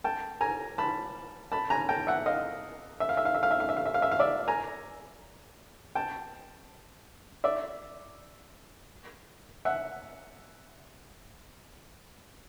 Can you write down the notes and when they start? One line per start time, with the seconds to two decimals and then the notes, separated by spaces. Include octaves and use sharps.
0.04 G5 A5
0.41 G#5 A#5
0.78 A5 B5
1.52 A5 B5
1.70 G#5 A#5
1.89 G5 A5
2.07 E5 F#5
2.26 D#5 F5
3.00 E5
3.09 F5
3.17 E5
3.25 F5
3.35 E5
3.43 F5
3.51 E5
3.60 F5
3.69 E5
3.77 F5
3.86 E5
3.94 F5
4.02 E5
4.12 F5
4.20 D5 E5
4.48 G#5 A#5
5.95 G5 A5
7.44 D5 E5
9.65 E5 F#5